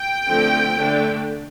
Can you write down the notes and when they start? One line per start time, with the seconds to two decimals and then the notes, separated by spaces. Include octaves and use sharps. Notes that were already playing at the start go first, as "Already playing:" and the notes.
Already playing: G5
0.27 D3 F3 A3 C4
0.75 D3 A3 D4